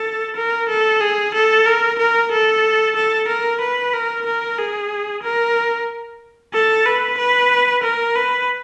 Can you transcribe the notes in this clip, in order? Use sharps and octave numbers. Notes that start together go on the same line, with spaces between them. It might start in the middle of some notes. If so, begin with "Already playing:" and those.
Already playing: A4
A#4
A4
G#4
A4
A#4
A#4
A4
A4
A#4
B4
A#4
A#4
G#4
A#4
A4
B4
B4
A#4
B4